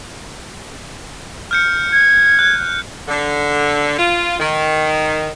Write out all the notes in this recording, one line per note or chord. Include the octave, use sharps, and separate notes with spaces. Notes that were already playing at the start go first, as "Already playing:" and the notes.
F6 G6 C#7
G#6
F#6
D3
F4
D#3